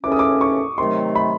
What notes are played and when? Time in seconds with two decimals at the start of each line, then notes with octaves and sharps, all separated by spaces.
0.04 D#2 C#3 E3 A3 C#4 D6
0.12 D#6
0.19 D6
0.41 C#6
0.78 C3 D#3 F#3 A3 C6
1.15 B5